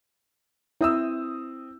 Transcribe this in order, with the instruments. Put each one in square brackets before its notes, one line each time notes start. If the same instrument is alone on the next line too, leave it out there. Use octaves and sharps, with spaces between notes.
[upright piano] C4 D#6 E6 [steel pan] E4